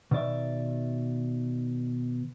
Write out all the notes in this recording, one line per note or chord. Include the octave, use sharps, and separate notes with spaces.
B2 D#3 D5 E5